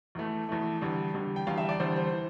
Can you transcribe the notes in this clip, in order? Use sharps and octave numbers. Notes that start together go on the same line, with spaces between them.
E2 E3 A3
E2 E3 A3
E2 D3 G3
E2 D3 G3
G5
E2 D3 G3 F5
E5
D5
E2 D3 G3 C5
C5
E3